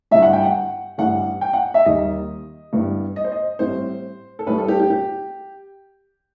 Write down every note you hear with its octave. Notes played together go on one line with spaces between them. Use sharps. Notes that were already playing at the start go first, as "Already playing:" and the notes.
G1 G2 E3 G3 E5
F#5
G5
F#5
A1 G2 E3 G3 F#5
G5
F#5
E5
D#2 D#3 G3 D#5
G2 E3 G3 B3
D#5
C5
D#5
A1 A2 G3 C4 C5
A4
A1 A2 G3 B4
A4
G4
G4
G4